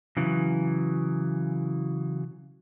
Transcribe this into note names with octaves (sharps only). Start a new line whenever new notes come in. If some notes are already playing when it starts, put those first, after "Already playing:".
C#3 E3 F#3